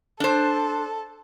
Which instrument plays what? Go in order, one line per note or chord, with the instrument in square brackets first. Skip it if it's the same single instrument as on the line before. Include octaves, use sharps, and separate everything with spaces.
[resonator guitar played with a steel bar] D4 C5 [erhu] A4